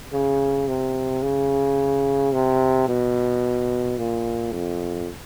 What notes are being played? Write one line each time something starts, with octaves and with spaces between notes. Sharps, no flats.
C#3
C3
C#3
C3
B2
A#2
F2